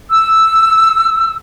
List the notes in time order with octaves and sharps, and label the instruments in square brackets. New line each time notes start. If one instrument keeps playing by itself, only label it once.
[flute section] E6